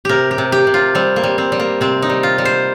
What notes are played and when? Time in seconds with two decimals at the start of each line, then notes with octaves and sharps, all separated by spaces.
0.05 C3 G4 A#4
0.31 G4
0.38 C3
0.52 G4
0.67 C3
0.74 F4
0.95 G3 C4
1.16 A#3
1.23 G3
1.38 C4
1.52 G3
1.60 A#3
1.81 C3 C4
2.02 D#4
2.09 G3
2.23 F4
2.38 G3
2.45 C5